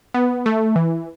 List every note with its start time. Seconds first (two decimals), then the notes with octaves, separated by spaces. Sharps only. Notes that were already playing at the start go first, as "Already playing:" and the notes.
0.14 B3
0.46 A3
0.76 E3